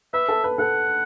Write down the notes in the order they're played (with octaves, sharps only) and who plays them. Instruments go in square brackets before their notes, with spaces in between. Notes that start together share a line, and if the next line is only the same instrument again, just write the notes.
[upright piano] B4 [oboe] E5
[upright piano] A4
B4
[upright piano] A4 [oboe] F#5